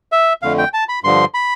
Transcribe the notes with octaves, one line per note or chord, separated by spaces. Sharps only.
E5
F2 D3 A3 F5
G5
A5
B5
G2 D3 F3 C6
B5